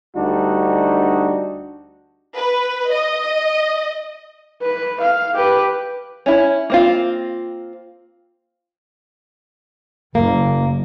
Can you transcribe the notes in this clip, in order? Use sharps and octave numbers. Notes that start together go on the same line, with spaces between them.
D2 G3 D4 D#4 F#4
B4
D#5
B4
F5
G4 B4
C#4 E4
A#3 C4 F4
F#1 A#3